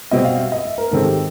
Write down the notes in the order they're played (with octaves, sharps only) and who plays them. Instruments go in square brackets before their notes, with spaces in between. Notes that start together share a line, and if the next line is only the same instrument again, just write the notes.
[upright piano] B2 G3 C4 D#5
F5
E5
D#5
E5
A#4
G#2 D#3 G#3 C4 A4
G4